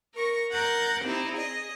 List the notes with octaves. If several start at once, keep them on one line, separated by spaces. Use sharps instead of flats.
A#4 C#6 A#6
A#4 F#5 G6 A6
C4 D#4 E4 G4
G#4 D#5